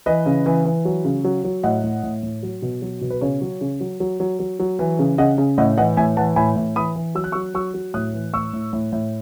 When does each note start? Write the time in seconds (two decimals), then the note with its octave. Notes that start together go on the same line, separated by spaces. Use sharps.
0.06 E3 B4 D#5
0.26 C#3
0.46 E3
0.65 E3
0.85 F#3
1.05 C#3
1.25 F#3
1.44 F#3
1.63 A2 D#5 F#5
1.84 A2
2.03 A2
2.23 A2
2.43 F#3
2.62 B2
2.82 F#3
3.01 B2
3.10 B4
3.21 C#3 C#5
3.41 F#3
3.61 C#3
3.81 F#3
4.00 F#3
4.20 F#3
4.40 F#3
4.60 F#3
4.79 E3
4.99 C#3
5.18 C#3 D#5 F#5
5.38 C#3
5.58 A2 D#5 F#5
5.77 E3 D#5 F#5
5.97 A2 E5 G#5
6.17 E3 F#5 A5
6.36 A2 G#5 B5
6.56 A2
6.76 E3 B5 D#6
6.96 E3
7.15 F#3 E6
7.24 F#6
7.32 F#3 C#6 E6
7.54 F#3 C#6 E6
7.74 F#3
7.94 A2 D#6 F#6
8.14 E3
8.34 A2 C#6 E6
8.53 A2
8.73 A2
8.92 A2